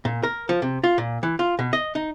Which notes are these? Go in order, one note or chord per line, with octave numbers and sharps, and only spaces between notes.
A#2
A#4
F3
C3
F4
A#2
E3
F4
B2
D#5
D#4